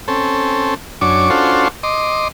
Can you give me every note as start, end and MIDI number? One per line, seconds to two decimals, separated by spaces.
0.08 0.74 60
0.08 0.74 61
0.08 0.74 69
1.01 1.30 42
1.01 1.30 62
1.01 1.30 73
1.01 1.30 86
1.30 1.68 61
1.30 1.68 62
1.30 1.68 65
1.30 1.68 66
1.30 1.68 69
1.30 1.68 72
1.83 2.28 75
1.83 2.28 84
1.83 2.28 86